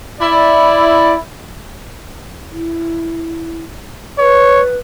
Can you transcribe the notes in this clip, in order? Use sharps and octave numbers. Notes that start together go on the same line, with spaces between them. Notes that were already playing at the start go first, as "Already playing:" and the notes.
E4 D5
E4
B4 C#5